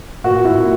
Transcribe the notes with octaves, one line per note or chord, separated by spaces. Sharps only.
A#2 F#4
A#2 E4